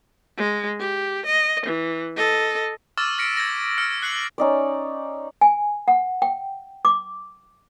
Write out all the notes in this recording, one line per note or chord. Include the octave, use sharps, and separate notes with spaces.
G#3
G4
D#5
E3
A4 D#5
C#6 D6 E6 F6 A6 E7
F6 A#6 B6 C#7 D7
G#6 A#6
F6 C#7
F#6 C7 C#7 F#7
C#4 D#4 D5
G#5
F#5
G5
D6